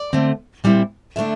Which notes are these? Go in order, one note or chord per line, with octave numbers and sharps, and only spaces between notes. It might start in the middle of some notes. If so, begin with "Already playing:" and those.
Already playing: D5
D3 A3 C4
A#2 G3 C4 E4
D3 A3 D4 E5